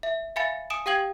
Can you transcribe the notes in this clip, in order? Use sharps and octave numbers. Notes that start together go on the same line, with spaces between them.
E5
E5 F5 G#5 B5 A6 C#7
G#5 D#6 D7 E7
G4 F5 G5 D#6 G#6 F#7